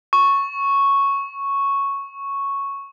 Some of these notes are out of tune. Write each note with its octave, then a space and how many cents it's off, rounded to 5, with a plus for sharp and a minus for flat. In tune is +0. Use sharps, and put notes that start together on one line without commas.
C#6 -5